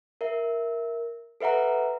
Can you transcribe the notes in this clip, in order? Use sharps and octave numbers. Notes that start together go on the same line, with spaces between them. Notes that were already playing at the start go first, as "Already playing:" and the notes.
A#4 E5
A4 B4 E5 F#5 A#5